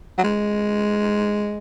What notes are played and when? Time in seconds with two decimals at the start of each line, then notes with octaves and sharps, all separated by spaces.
0.18 F#3
0.24 G#3